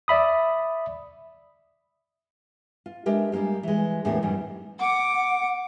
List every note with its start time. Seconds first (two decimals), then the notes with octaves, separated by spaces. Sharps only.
0.08 D5 E5 B5 D#6
2.86 F4
3.06 G#3 D4 G4 A#4 E5
3.32 G3 G#3 A#3 F4 G4
3.63 E3 G#3
4.05 E2 A2 D3 A#3 G4 A#4
4.23 F#2 D#3 E3 G3
4.80 F#5 D6